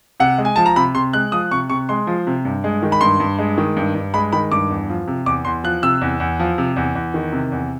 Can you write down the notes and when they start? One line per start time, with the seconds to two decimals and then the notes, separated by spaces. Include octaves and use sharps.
0.20 C3 F#5
0.38 G#3
0.45 G#5
0.56 F3 A5
0.66 A#5
0.76 C3 B5
0.95 C3 C6
1.13 G#3 F#6
1.32 F3 D#6
1.51 C3 C#6
1.70 C3 C#6
1.89 G#3 C6
2.07 F3
2.27 C3
2.45 G2
2.64 G#3
2.83 D#3
2.92 B5
3.01 G2 C6
3.20 G2
3.38 G#3
3.58 D#3
3.77 G2
3.95 G2
4.14 G#3 B5
4.33 D#3 B5
4.52 G2 D6
4.70 E2
4.89 F3
5.07 C3
5.26 E2 D6
5.45 E2 C6
5.64 F3 F#6
5.82 C3 E6
6.01 E2
6.20 E2
6.39 F3
6.58 C3
6.76 E2
6.95 E2
7.14 D#3
7.33 C3
7.52 E2